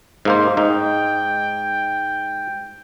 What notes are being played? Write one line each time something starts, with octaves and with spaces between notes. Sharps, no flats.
G#2 A#3 C5
G#2 D#4 G5